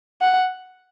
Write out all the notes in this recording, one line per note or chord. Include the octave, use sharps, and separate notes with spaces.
F#5